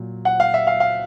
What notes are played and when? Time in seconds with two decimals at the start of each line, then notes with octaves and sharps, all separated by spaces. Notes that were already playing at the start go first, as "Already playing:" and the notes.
Already playing: A#2 F#3
0.25 F#5
0.40 F5
0.54 E5
0.67 F5
0.80 F5